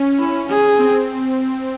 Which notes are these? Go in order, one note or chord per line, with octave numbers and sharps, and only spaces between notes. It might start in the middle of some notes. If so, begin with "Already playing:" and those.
Already playing: C#4
E4
G#4
C4